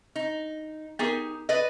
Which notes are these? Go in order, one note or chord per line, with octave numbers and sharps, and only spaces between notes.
D#4
B3 D#4 G4 G#4 A#4
B4 D5 D#5